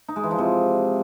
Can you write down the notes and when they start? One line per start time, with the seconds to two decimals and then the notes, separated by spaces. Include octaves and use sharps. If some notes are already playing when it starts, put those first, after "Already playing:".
0.09 D#4
0.16 G#3
0.23 E3
0.31 F3
0.38 C3